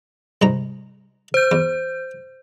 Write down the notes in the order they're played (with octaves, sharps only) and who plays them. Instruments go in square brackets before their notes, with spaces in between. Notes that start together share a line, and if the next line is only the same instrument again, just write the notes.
[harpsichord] C2 G#2 A#5
[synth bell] C5 G6
[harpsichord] E2